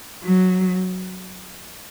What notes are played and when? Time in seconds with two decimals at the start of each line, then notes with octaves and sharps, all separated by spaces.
0.23 F#3